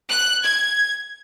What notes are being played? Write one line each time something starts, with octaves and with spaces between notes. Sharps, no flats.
F#6
G#6